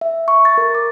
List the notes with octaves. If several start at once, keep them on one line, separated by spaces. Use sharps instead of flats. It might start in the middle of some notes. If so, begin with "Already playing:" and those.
E5
C#6
A6
A#4
D6